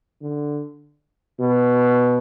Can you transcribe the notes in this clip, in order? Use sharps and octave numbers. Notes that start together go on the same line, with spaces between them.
D3
B2